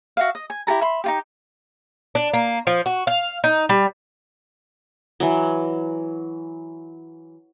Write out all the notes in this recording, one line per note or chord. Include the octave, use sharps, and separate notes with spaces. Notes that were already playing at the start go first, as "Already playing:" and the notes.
F#4 E5 F5
D#5
G#5
E4 G4 A4 A#5
E5 B5 C6
D#4 F4 G4
D4
A#3
F3
F#4
F5
D#4
G3
E3 F#3